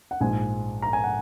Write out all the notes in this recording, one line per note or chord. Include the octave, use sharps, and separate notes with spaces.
F#5
A#1 G#2 G#3 G#5
A#5
G#5
F#5